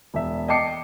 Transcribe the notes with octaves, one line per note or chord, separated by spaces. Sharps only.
E1 E5
D#5 G5 A5 D6 C7 C#7